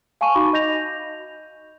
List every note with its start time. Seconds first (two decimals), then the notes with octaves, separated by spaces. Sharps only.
0.21 F5 G#5 A5 C#6 D#7
0.35 D#4 F#4 F5 B5 C#6 D6
0.53 D#5 G6 A#6 F7